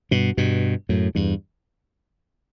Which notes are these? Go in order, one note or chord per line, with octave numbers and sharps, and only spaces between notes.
G2 B2
G2 B2
F#2 A2
E2 G2